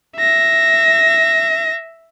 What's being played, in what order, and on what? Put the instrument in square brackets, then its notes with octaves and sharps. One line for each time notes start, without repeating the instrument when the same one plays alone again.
[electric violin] E5 A#6